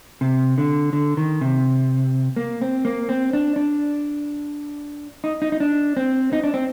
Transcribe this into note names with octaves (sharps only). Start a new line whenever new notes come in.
C3
D3
D3
D#3
C3
A#3
C4
A#3
C4
D4
D4
D#4
D#4
D#4
D4
C4
D#4
D4
C4